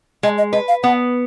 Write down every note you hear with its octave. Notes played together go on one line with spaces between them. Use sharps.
G#3 D#5
D#5
B4 D#5
F5
B3 F#5